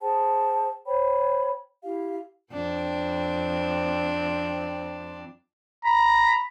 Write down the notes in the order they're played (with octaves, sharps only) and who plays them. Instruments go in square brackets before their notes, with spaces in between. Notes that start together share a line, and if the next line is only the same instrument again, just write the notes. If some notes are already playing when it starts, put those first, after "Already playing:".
[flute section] G#4 C5 G5 A5
C5 C#5 G5 B5
E4 G4 F5
[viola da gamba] F2 C4 D4
[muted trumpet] A#5 [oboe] B5